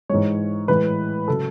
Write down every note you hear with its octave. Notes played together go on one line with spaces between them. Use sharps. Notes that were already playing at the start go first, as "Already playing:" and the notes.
G#2 E3 G#3 C#5
A2 E3 G#3 B4
C#3 F#3 A4